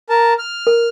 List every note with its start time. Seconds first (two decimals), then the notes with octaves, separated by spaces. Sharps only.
0.09 A#4 A5
0.38 F6
0.67 A#4